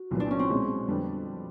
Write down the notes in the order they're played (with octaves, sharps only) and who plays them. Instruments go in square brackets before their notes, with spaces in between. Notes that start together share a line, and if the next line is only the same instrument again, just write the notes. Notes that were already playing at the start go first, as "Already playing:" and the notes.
Already playing: [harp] F#4
[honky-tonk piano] C2 A#2 F#3 B3
[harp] D4
C#4
C4
[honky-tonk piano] B2 G#3 C#4
F2 D3 G3 B3 D4